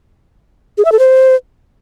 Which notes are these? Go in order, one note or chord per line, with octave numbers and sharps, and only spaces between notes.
G#4
E5
A4
C5